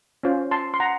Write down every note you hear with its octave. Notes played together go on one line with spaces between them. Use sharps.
C#4 F4 C5
A5 C6
C6
F#5 A#5